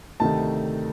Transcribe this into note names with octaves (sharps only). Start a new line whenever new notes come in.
D2 C3 D#3 A3 A5